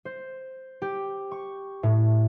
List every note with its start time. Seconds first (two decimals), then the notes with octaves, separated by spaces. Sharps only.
0.05 C5
0.82 G4
1.31 C#6
1.83 A2